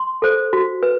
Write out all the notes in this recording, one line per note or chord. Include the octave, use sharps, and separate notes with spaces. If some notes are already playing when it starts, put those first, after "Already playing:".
Already playing: C6
A4 C5
F#4
B4